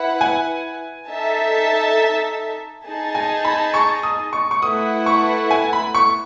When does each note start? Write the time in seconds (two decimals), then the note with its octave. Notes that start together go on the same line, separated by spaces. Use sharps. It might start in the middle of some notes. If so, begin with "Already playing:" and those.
Already playing: E4 B4 F#5
0.21 G#5
1.09 D#4 A4 E5 A5
2.85 D#4 G#4 D#5 A5
3.15 G#5
3.45 B5
3.74 C#6
4.03 D#6
4.33 C#6
4.51 C#6
4.62 A3 E4 B4 F#5 D#6
5.06 C#6
5.51 G#5
5.73 B5
5.95 C#6